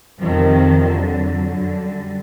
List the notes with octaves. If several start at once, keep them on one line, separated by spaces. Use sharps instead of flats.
F2 C3 D#3 F3
F3
F2 D3 F#3
F#2 D3
G3